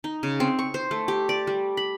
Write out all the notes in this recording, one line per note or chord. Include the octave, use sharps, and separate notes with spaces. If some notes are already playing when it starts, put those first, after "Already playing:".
D#4
C#3
C4
C#6
C5
A3
G4
D5
G3
B5